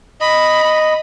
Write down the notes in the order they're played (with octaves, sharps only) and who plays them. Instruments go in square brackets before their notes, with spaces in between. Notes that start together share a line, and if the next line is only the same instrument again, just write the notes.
[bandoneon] D#5 [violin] B5